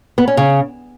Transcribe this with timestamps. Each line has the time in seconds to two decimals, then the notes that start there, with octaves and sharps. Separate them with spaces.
0.18 B3
0.28 C#4
0.37 C#3